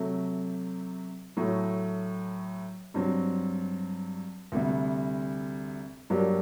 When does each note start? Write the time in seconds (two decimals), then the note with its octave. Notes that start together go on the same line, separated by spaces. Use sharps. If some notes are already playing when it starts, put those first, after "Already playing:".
Already playing: C3 F#3 A3
1.37 A2 F#3 A3
2.94 G2 F#3 C4
4.52 D2 C3 G3
6.10 G2 F#3 A#3 D4 G4